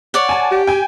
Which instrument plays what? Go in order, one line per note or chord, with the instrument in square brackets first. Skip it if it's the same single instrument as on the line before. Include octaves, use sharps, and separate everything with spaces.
[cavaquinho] C#5 D5 F#5
[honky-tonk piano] G#5 A5
[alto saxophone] G4
[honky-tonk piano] G5 G#5